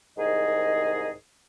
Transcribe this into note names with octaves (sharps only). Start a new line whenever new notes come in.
C2 G#2 D#3 G#4 D#5